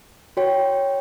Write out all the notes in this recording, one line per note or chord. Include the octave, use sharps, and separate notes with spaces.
F#4 C#5 G5